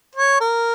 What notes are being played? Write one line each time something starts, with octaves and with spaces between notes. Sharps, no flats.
C#5
A#4